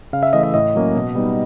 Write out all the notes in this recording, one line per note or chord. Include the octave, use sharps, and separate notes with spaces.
C#3 F5
E5
E3 A3 D#5
D#5
A2 D#5
F#3 A#3 C#4
B2
G3 B3 D#4